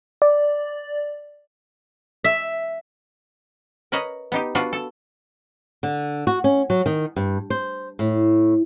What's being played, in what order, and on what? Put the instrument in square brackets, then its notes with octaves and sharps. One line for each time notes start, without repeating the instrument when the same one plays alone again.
[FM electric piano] D5
[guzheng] E5
[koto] A#4 B4 C#5 D#5
B3 D#4 G4
B3 D4 F4 F#4
A4
[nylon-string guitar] D3
F#4
C#4
F#3
D#3
G2
C5
A2